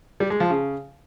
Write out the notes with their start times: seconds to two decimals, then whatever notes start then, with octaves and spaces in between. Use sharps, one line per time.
0.20 G3
0.30 G#3
0.40 F3
0.50 C#3